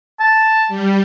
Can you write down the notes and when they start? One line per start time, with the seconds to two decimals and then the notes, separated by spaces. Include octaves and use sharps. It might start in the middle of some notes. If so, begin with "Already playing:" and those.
0.20 A5
0.68 G3